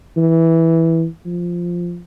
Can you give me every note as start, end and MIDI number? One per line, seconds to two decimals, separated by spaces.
0.17 1.06 52
1.25 2.00 53